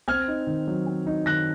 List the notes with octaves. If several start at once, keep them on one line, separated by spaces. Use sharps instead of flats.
C4 F6 G#6
D#4
D#3
F#3
C4
D#4
D#3 F#6 A#6